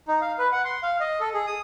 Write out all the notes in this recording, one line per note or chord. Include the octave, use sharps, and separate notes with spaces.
D#4
F5
B4
F#5
C6
F5
D#5
A4
G#4
D#6